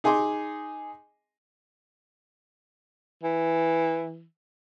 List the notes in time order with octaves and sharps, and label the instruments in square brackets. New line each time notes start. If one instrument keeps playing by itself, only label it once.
[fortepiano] D#4 G#4 G#5 C6 D6
[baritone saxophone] E3